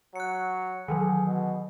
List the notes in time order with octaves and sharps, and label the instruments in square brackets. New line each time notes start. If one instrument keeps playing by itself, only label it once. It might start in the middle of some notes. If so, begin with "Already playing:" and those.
[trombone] F#3 [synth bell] F#6 C#7
[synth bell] D#3 E3 F#3 [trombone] G#4
[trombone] B2